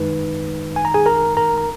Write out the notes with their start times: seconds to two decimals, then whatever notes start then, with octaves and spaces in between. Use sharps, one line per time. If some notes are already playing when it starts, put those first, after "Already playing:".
Already playing: F#2 D#3 G#3 D#4 B4
0.76 G#5
0.85 A#5
0.94 G#4 G#5
1.06 A#4 A#5
1.37 A#4 A#5
1.58 A#5